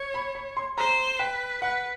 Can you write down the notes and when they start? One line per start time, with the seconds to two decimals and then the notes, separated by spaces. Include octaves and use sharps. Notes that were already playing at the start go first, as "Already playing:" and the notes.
Already playing: C#5
0.14 B5
0.35 B5
0.57 C6
0.78 C5 A#5
1.19 B4 G5
1.62 B4 F#5